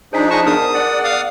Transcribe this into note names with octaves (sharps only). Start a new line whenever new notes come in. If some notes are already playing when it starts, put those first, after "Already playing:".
F3 D4 D#4 G#4 C5 G#5 B6
G#4 D#5 A5 C#6
B3 G#4 A#4 D#6
D5 F#5
F5 D#6